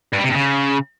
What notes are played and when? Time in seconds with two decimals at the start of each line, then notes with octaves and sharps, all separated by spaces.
0.13 G2
0.19 G3
0.24 C3
0.30 G2
0.35 C#3